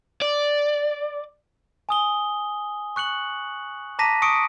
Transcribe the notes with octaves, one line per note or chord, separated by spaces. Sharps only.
D5
G#5 D#6 G7
C#6 F#6 C#7 F#7
A5 A#5 D6 A#6 B6 D#7
C#6 D#6 C#7 D7